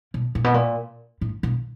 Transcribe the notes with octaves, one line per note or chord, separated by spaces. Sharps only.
B2
A#2
B2
A#2
A2
B2